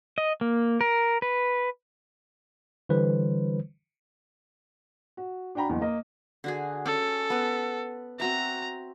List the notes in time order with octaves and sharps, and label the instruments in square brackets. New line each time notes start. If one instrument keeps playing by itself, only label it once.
[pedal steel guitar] D#5
A#3
A#4
B4
[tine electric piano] D3 E3 G3 B4 C5
[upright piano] F#4
D4 F#4 G5 A#5 B5
F#1 E2
A#3 D#5
[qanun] D3 F#4 G#4
[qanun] C#4 [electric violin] A4
[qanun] B3 B4
[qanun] C4 F#4 E5 [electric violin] A#5